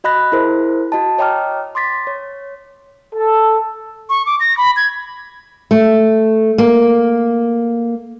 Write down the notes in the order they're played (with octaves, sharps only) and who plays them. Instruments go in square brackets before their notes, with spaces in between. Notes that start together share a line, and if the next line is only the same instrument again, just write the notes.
[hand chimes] F#4 D#5 B5 F#6 A#6
E4 G#4 A#4 C5
F#4 D#5 A5
C#5 D#5 G5 A#5 D6 F6
C6 D6 A6 B6
C#5
[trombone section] A4
[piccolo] C#6
D6
A#6
B5
G#6
[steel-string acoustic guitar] A3
A#3